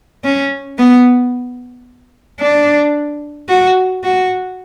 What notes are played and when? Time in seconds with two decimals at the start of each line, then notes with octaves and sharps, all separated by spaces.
0.24 C#4
0.78 B3
2.40 D4
3.48 F#4
4.04 F#4